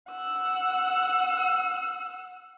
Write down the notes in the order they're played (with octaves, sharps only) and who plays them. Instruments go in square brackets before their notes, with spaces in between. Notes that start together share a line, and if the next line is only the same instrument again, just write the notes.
[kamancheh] F#5 E6